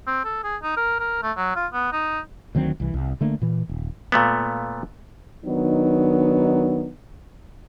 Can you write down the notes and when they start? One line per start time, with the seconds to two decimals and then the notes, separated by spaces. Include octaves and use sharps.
0.07 C4
0.25 A4
0.44 G#4
0.63 D#4
0.77 A#4
1.00 A#4
1.23 A3
1.37 F#3
1.56 F4
1.73 B3
1.93 D#4
2.55 D2 D#3 F#3 C4
2.80 C2 E3
2.94 C2
3.21 D3 A3 A#3 D4
3.42 A#2 E3
3.69 D#1
4.12 A#2 A3 B3
5.45 D#3 F#3 B3 D4 D#4